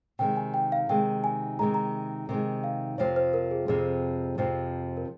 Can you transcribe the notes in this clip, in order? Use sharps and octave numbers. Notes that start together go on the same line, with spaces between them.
C3 D#3 G#3 G5
G#5
G5
F5
C3 D#3 G#3 G5
G#5
C3 D#3 G#3 A#5
A#5
C3 D#3 G#3
F5
F2 C3 F3 C4 C#5
C5
A#4
G#4
F2 C3 F3 C4 G#4
F2 C3 F3 C4
A#4